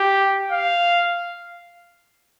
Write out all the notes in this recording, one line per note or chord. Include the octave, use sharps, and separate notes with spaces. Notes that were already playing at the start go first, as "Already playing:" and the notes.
Already playing: G4
F5